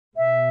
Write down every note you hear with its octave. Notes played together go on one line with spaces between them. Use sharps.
B2 E5